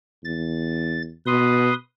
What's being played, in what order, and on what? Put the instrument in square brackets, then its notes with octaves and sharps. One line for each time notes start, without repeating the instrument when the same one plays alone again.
[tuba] E2 [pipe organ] A6
[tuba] B2 [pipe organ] B4 C6 D#6